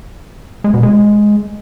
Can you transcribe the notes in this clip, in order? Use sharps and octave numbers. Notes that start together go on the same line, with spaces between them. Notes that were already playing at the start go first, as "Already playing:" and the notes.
G#3
B2
G#3